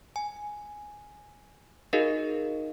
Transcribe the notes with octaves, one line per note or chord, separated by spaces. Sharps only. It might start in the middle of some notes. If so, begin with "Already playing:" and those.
G#5
D#4 F#4 G#4 A#4 D#5 F5